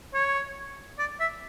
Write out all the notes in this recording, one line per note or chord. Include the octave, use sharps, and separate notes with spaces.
C#5
D5
E5